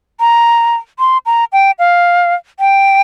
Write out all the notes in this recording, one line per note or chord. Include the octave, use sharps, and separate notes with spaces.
A#5
C6
A#5
G5
F5
G5